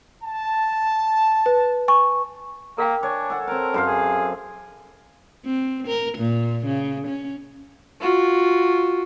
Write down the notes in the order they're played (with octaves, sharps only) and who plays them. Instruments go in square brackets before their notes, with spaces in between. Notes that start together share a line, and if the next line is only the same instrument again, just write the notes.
[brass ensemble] A5
[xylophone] B4
G#5 C#6
[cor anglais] A#3 [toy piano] A#4 F5 G5
[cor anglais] D4 [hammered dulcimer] C#5 G#5
[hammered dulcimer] A4 F#5
[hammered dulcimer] C4 A5 [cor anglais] A#4
[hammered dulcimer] F#2 C5 F5 [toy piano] B4
[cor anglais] G#4
[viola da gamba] C4
A#4
A#2
C#3
C#4
[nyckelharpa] F4 F#4